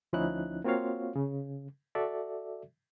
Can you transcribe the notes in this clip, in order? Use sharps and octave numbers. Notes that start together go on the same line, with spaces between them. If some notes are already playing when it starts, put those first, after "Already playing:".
D2 F3 C#4 D#4 E4 F#6
A#3 C4 F4 F#4 C#5 F5
C#3
F#4 A4 D5 E5